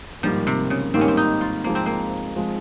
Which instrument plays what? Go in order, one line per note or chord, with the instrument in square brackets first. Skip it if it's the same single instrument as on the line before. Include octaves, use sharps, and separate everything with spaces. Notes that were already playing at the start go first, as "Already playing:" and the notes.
[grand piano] G#2 D#3 G3 A#3 [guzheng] F3
[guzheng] C3
C#3
[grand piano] G#2 D#3 G3 A#3 [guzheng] C4
[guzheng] C#4
C4
D#4
F4
[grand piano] G#2 F3 G#3 [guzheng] A#3
[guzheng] C4
A#3
[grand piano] F3 G#3